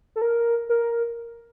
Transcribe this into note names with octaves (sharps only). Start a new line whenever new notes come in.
A4
A#4
A#4